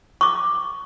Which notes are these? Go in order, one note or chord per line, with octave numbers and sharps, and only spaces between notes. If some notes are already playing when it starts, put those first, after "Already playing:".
C#6 D6